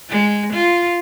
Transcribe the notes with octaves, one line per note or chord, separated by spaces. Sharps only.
G#3
F4